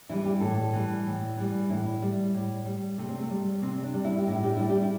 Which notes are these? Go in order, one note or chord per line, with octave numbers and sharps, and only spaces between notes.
E3 G3 E4
G4
A2 A4
E3 G3
A2
E3 G3
A2 E4
G3
A2
G3
C3 A3
C4
A3
G3
C3 C4
D4
G3
E4
G4
A2 E4
G4
G3 E4
G4
E4